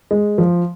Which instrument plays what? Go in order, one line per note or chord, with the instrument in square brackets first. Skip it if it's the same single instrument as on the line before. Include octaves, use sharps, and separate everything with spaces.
[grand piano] G#3
F3